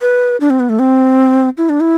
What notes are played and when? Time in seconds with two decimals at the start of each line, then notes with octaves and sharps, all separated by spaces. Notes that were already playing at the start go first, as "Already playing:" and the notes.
0.01 B4
0.40 D4
0.50 C4
0.60 B3
0.69 A3
0.79 C4
1.58 E4
1.69 D4
1.80 E4